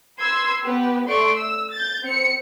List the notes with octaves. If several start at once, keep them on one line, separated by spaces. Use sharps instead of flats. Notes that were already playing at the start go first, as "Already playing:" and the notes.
B4 C6 E6 G#6
B3 G4 B4
A3 D5 C6 C#6 D7
E6
G6 A6
C4 C#7